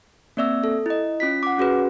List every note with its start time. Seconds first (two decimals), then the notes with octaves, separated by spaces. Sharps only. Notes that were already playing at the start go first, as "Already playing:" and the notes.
0.37 A#3 C4 D5 E5 E6
0.64 A4
0.86 E4 D#5
1.20 C#4 F4 B6
1.43 F#5 D6
1.58 C#4 F#4 G#4 B4